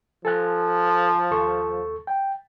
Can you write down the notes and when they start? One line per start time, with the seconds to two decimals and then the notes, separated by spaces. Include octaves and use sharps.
0.25 F3 A4 G#5 F#6
1.31 D#2 A4 C#6
2.07 G5